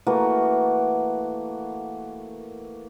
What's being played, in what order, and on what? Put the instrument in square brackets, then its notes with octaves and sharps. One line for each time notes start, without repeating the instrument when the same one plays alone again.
[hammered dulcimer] E3 A3 A#3 F#4